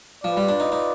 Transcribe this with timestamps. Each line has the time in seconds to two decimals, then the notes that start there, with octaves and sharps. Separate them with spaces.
0.24 F3 F4 B4 D5
0.37 G3
0.49 D4
0.60 D#4
0.72 D#4